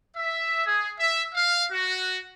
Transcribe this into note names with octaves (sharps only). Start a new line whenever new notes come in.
E5
G#4
E5
F5
F#4